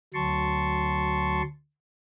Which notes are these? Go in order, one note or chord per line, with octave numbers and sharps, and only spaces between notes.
D2 F#3 A5 C6 C#6